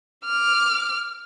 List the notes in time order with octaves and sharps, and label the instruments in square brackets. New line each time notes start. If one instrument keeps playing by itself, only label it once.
[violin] D6 F6